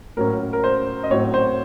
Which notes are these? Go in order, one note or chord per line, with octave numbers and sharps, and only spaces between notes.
A2 F#3 A#3 C#4 A#4
A#4
C5
D#5
A2 F#3 C4 C#5
C5